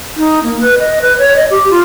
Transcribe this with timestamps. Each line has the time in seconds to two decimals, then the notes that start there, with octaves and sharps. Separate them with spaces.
0.17 D#4
0.43 A#3
0.61 B4
0.79 D#5
1.02 B4
1.18 C#5
1.36 D#5
1.51 G4
1.71 F4